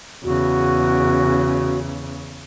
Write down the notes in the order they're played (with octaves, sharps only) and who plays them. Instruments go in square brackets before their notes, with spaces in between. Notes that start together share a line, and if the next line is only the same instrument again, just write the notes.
[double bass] E2 C#3 [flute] F#4